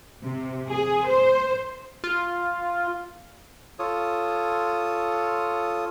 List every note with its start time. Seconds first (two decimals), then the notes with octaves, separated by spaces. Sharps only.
0.23 C3
0.69 G#4
1.07 C5
2.04 F4
3.79 F4 A4 C#5 D#6